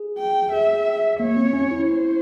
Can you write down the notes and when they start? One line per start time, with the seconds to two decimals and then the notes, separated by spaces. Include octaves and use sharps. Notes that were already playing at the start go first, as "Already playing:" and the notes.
Already playing: G#4
0.18 G5
0.52 G#4 E5
1.20 A#3 C#5
1.37 C4
1.53 C#4
1.71 E4
1.87 C5